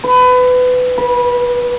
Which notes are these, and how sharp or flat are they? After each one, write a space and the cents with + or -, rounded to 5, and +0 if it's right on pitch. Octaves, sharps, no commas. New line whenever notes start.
B4 +25
B4 -20